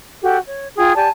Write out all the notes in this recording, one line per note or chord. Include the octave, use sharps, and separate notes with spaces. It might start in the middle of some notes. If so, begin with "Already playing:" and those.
F#4 G4 A4
C#5
F4 G#4 G5
G4 D5 G#5 A5